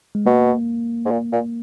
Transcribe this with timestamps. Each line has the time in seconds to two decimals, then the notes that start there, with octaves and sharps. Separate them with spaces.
0.15 G#3
0.26 B2 A#3
1.05 G#2
1.11 A#2
1.33 A#2